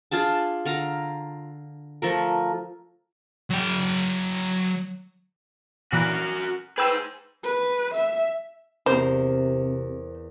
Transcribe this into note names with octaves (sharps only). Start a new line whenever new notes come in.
D4 F4 G#4 A5
D3 F5 A#5
F3 A3 A#4
F#3 G5
A#2 E3 F#4 A#4 F#6
G#4 B4 C5 G5 E6
B4
E5
E2 C3 A#4 C5